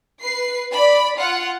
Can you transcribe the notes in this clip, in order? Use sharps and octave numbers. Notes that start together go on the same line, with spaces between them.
B4 C7
D5 B5
F4 F#5